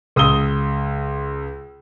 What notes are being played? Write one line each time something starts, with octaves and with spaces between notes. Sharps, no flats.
C#2 D#6 E6 G7